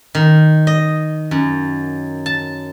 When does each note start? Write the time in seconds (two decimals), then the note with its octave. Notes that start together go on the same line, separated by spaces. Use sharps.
0.15 D#3
0.67 D#5
1.31 F#2
2.26 A5